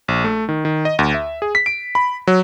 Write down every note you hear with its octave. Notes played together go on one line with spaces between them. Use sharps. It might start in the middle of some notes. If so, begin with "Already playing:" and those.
A#1
A3
D#3
D#3
D#5
D2
E5
G#4
B6
D7
B5
F#3